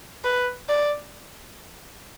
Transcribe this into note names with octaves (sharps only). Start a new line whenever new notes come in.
B4
D5